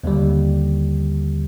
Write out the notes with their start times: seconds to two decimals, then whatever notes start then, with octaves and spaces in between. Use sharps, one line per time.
0.04 D#2 D3 G3